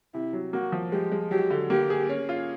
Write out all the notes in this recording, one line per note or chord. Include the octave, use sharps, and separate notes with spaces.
C3 E4
F#3
A#3 F#4
F3
G#3 G4
G#3
F#3 G4
D3
A#3 G4
G#4
C#4
F4